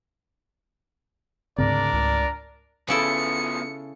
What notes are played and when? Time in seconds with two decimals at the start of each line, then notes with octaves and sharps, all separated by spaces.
1.58 D2 G#2 C#3 C4 D4 A#4 D5
1.93 C#2
2.88 C#3 F3 B3 E4 A4 C#7